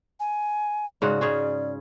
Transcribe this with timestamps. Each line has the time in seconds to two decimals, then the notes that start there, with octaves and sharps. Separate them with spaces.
0.20 G#5
1.02 G#2 C#3 F#4 D5
1.21 C#3 C#4 G#4